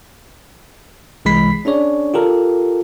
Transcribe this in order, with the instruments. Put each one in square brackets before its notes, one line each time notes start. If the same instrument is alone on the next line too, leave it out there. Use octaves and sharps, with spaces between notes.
[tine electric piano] C2 E3 G#3 B5 B6 C7
C#4 D4 G#4 C#5 D5
F4 G4 A4 A#4